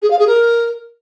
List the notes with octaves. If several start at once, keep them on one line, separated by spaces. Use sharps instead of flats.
G#4
F5
G#4
A#4